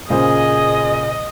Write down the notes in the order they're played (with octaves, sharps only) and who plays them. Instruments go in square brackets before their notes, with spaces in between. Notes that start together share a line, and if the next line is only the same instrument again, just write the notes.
[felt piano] A#2 C#3 C5 [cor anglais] G#4 [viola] D#5